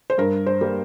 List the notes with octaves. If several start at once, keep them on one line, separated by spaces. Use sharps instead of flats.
C5
G2 A#4
C5
G3 A#3